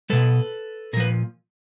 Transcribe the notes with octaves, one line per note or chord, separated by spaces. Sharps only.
B2 G3 A4 B4
A#2 F3 A#4 B4